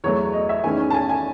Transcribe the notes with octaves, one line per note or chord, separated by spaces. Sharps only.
E2 B2 F#3 A3 C#5
D#5
E5
E2 D#3 A3 C#4 G#5
A5
G#5
G#5